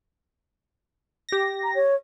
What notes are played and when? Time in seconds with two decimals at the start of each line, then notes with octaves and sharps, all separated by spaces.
1.29 G4 A#6
1.63 A#5
1.75 C#5